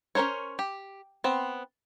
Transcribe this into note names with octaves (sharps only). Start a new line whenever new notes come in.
C#4 E4 A#4 C5 C#5
G4
B3 C4